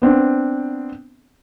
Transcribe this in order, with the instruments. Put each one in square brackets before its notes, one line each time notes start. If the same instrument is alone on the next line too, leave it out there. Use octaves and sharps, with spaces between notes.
[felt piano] B3 C4 D4